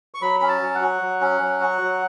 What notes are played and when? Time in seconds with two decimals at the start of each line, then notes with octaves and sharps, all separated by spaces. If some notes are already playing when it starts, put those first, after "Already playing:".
0.14 C#6
0.22 F#3 B5
0.40 C#4 B5
0.48 A5
0.61 F#3
0.75 F#5
0.81 F#4
1.02 F#3
1.21 C#4
1.41 F#3
1.60 F#4
1.81 F#3